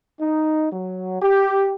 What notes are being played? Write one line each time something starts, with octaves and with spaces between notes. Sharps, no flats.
D#4
F#3
G4